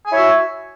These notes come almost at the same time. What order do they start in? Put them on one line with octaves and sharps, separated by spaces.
G#5 E4 C#5 E5 F#4